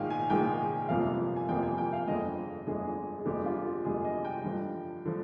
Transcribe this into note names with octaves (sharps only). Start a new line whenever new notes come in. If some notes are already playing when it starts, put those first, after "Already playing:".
Already playing: A#1 G#2 D#3 G#3 F5 G5 G#5
G#5
A#1 G#2 D#3 G#3 G5
G1 F2 C3 F3 A#3 F5
G#5
G1 F2 C3 F3 A#3 G5
G#5
G5
F5
G1 F2 D3 G#3 D#5
G1 F2 D3 G#3 G#4
G#4
G1 F2 D3 G#3 G4
F4
G4
G1 F2 D3 G#3 G#4
D#5
G5
G2 D3 F3
D3 F3